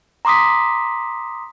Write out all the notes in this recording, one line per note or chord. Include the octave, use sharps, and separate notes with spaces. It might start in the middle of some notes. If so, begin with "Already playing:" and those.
A#5 C6 D6 D#6 B6